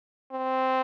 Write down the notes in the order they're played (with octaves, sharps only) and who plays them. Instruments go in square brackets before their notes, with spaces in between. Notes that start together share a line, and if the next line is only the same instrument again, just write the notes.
[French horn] C4